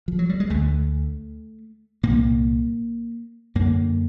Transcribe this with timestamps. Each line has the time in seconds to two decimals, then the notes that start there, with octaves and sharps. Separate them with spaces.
0.08 F3
0.19 F#3
0.29 G3
0.40 G#3
0.50 D2 D3 A3
2.03 C2 A#2 A#3
3.55 F#2 D3 A#3